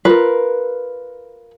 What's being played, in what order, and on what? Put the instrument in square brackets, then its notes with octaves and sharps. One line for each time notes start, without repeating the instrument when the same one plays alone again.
[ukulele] F4 A#4 B4